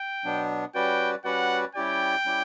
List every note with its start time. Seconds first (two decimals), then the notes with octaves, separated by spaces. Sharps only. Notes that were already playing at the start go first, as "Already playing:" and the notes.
Already playing: G5
0.24 B2 F#3 B3 D4
0.75 G3 C#4 F#4 B4 D5 G5
1.25 G3 C#4 F#4 B4 D5 F#5
1.75 G3 C#4 E4 G4 D5 G5
2.25 G3 C#4 E4 G4